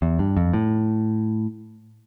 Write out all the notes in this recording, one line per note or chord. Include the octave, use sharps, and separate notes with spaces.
E2
G2
F2
A2